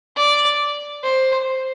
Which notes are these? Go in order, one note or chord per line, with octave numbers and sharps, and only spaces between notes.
D5
C5